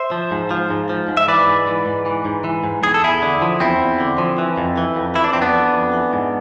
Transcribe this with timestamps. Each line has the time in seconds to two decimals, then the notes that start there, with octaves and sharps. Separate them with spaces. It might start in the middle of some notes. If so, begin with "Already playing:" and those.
Already playing: C5 E5
0.11 F3
0.31 G#2
0.51 F3
0.70 G#2
0.90 F3
1.08 G#2
1.17 E5
1.28 E3 B4 D5
1.48 G#2
1.67 E3
1.86 G#2
2.06 E3
2.25 G#2
2.44 E3
2.64 G#2
2.83 E2 G#4
2.94 A4
3.03 E2 E4 G#4
3.22 D3
3.42 F3
3.60 E2 C4 E4
3.80 E2
4.00 D3
4.18 F3
4.38 E3
4.58 F2
4.78 E3
4.96 F2
5.15 E3 E4
5.24 D4
5.33 F2 C4
5.42 B3 D4
5.55 E3
5.74 F2
5.93 E3
6.13 G#2